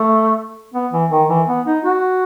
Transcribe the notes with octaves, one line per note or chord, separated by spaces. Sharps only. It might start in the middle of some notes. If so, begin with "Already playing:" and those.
Already playing: A3
B3
E3
D#3
E3
B3
D#4
F#4